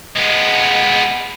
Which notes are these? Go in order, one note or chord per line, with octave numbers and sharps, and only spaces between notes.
G#3 B3